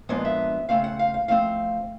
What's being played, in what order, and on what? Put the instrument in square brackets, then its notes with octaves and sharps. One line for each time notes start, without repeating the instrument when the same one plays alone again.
[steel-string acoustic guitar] A#2 F3 G#3 B3 D4 D#5
E5
C#3 F3 A3 C4 F5
F#5
F5
F5
F3 A3 C4 F5